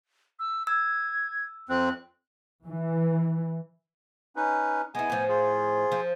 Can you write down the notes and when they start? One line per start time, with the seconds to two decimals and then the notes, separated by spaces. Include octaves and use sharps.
0.39 E6
0.67 E6 G#6
1.69 F2 C4 F#6
2.65 E3
4.36 C#4 D#4 B4
4.95 G#3 B3 E4 G#5
5.10 A2 F3
5.29 F4 G#4
5.92 F3